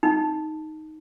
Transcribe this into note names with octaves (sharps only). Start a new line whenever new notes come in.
D#4